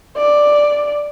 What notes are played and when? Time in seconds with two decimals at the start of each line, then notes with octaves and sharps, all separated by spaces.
0.17 D5